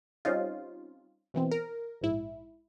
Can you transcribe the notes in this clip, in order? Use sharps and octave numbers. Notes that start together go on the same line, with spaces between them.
G3 C4 C#4 D#4 F4
B2 E3 C4
A#4
A#1 G#2 E4